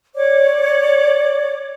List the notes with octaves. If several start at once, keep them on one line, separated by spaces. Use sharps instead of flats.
C#5 D5 D6